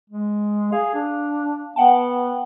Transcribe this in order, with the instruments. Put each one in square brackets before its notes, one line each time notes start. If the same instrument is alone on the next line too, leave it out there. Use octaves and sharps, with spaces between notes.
[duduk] G#3
[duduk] G#4 [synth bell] F5
[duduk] D4
[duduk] B3 [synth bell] F#5 G5 A5